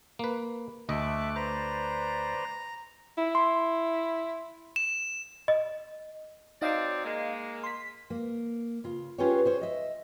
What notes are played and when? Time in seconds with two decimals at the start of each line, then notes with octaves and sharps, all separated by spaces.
0.19 A#3 B4
0.89 D2 A3 D#5 E5 D6 F#6
1.36 B4 C5 D5 A#5
3.18 E4
3.35 C6
4.76 E7
5.48 D#5
6.62 F#3 C4 D#4 D5 D#5 F5
7.04 G#3 A#3
7.64 C6 B6
8.10 A#3
8.84 C#3 F4
9.18 C#4 F4 G4 G#4 B4 C#5
9.45 G#4 C5 C#5
9.61 D#5 E5